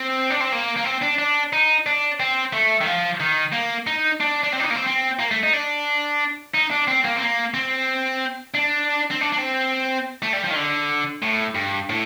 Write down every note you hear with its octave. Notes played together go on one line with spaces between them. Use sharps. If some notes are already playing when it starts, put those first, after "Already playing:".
Already playing: C4
D4
C4
A#3
A#3
C4
D4
D4
D#4
D4
C4
A3
D#3
F3
D#3
A#3
D#4
D4
D4
C4
D4
D#4
A#3
C4
C4
A#3
A3
D#4
D4
D#4
D4
C4
A#3
C4
A#3
C4
D4
C4
D4
D4
C4
A3
G3
F3
D#3
D3
A2
G2
A2